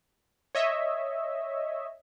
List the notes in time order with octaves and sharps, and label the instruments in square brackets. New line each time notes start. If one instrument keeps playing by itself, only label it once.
[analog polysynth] C#5 D#5 E5